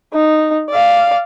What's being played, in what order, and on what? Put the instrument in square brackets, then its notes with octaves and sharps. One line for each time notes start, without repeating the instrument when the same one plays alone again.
[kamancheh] D#4
D5 F5